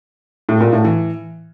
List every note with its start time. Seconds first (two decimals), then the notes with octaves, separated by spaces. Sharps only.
0.49 A2
0.61 A#2
0.73 A2
0.84 E3